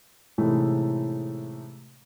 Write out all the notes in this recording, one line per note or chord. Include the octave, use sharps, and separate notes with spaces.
A2 C3 E3 G#3 A3 D#4